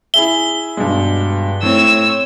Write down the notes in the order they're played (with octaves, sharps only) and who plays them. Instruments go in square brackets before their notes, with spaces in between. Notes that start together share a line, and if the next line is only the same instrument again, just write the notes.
[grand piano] E4 G#4 E5 [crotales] G7
[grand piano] G2 B2 G#3
[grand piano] A2 C4 [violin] C#5 E6